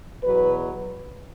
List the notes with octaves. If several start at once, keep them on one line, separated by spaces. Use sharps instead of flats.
E2 B2 F#3 B4